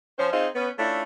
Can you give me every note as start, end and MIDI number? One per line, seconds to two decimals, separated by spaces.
0.18 0.29 53
0.18 0.29 61
0.18 0.29 72
0.32 0.48 60
0.32 0.48 63
0.32 0.48 65
0.32 0.48 68
0.32 0.48 72
0.55 0.69 59
0.55 0.69 61
0.78 1.03 57
0.78 1.03 61
0.78 1.03 62
0.78 1.03 64
0.78 1.03 65